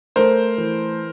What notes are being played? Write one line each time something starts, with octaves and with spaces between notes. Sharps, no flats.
A3 A#4 C5
E3